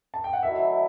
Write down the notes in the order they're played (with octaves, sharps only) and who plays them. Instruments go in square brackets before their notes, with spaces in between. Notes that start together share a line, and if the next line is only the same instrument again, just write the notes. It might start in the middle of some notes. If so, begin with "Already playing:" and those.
[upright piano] A5
G5
F#5
[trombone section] D#3 F#3 A3 E4 [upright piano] E5